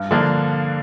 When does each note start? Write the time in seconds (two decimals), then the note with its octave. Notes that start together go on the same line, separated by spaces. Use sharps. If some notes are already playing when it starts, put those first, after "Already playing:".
Already playing: G2
0.11 D3 F3 A#3 D4